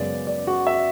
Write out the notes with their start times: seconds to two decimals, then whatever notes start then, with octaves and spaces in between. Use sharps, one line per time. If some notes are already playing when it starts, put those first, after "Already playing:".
Already playing: F#2 C#3 G#3 B3 D5
0.27 D5
0.47 F#4
0.67 E5